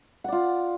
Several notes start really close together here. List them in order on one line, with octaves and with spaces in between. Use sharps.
F#5 D5 F4